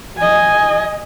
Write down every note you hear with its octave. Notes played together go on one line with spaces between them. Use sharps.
D#5 G#5